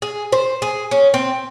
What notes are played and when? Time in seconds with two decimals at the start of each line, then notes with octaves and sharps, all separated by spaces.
0.02 G#4
0.32 C5
0.62 G#4
0.91 C#4
1.14 C4